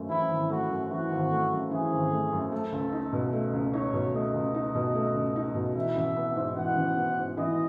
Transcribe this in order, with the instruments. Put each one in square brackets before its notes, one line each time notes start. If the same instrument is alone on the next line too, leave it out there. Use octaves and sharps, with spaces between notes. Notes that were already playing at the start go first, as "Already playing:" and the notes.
Already playing: [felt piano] G#1 F#2 A3
[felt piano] E3 [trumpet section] E4
[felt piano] G#1
[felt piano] A3 [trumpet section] F#4
[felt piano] F#2
[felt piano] E3 [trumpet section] F#4
[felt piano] G#1
A3
F#2
[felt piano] E3 [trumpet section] G#4
[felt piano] G#1
A3
F#2
[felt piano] A3 [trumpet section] A4
[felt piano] C#2
D#4
B2
A3
C#2
[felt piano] D#4 [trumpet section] C#5
[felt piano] B2
[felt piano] A3 [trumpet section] D#5
[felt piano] C#2
D#4
B2
A3
C#2
D#4
B2
[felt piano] E3 [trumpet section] E5
[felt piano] A1
B3
G#2
[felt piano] E3 [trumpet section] F#5
[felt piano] A1
B3
G#2
[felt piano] E3 [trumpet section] D#5